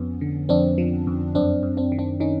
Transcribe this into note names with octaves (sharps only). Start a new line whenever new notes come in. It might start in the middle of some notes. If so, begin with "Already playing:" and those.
Already playing: F2 F3 B3 C#4
D3
F2 C4 D4
F3
F2
F#2 C4 D4
F#2
C4 D4
D#3
C4 D4
D#3 C#4 D#4